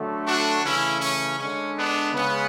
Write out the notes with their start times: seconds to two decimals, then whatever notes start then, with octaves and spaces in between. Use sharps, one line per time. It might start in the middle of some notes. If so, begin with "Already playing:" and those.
Already playing: D3 F#3 A3
0.26 D4 F#4
0.63 C#3 E3 A3 C#4 E4
1.01 C#4
1.39 D3 G#3 C#4
1.76 B3 D4
2.14 C#3 G#3 B3